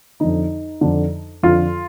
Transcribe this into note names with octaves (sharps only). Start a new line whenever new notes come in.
F2 D3 D#4
F2 D3
F2 D3 F4